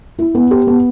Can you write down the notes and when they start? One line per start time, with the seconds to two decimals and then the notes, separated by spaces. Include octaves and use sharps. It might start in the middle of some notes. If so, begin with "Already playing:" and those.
0.19 E4
0.35 B3
0.51 G4
0.67 B3